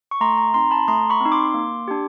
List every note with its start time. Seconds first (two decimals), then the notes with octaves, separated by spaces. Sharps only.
0.11 C#6
0.21 A3 A#5 C6
0.37 A#5 C6
0.54 C4 D#4 A#5 C6
0.71 A5 B5
0.88 A3 A#5 C6
1.10 B5 C#6
1.21 C4 D#4
1.32 C6 D6
1.54 A#3
1.88 D4 G4